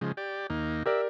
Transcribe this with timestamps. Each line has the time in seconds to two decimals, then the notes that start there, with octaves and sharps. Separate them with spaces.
0.01 C#3 F3 G#3
0.17 G4 D5
0.50 D#2 A#3 D#4
0.86 G4 A#4 D5 E5